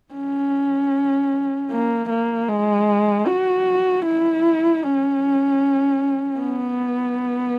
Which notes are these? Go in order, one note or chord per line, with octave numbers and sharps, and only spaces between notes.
C#4
A#3
A#3
G#3
F#4
E4
C#4
B3